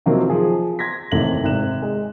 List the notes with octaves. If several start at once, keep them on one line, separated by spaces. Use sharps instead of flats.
C3 D#3 F3 F#3 A#3 C4
F3 G#4
C6 G#6 A#6 B6
A1 D#2 C3 D#3 A4 F#7
G#1 C3 F#6 E7
G#3